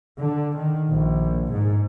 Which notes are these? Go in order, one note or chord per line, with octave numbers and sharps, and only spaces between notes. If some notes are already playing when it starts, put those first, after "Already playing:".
D3
D#3
A#1
G#2